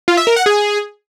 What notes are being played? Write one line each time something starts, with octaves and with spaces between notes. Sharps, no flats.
F4
E5
A#4
F#5
G#4